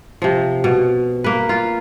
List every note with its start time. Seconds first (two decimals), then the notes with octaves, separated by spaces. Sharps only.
0.22 C3 F3
0.64 B2
1.24 A#3 B4
1.49 F4